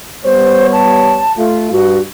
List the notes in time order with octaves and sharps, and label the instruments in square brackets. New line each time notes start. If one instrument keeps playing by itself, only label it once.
[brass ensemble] G3 B3 C#5 [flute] C5
[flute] A5
[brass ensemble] A3 F4
[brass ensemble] G2 [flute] F#4